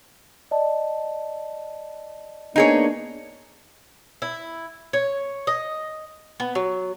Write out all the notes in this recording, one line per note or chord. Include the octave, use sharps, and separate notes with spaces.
D5 D#5 A5
A#3 B3 D4 D#4 G#4 C#5
E4
C#5
D#5
B3
F#3